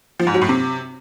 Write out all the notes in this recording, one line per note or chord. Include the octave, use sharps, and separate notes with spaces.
F3
G#2
F#3
A2
C3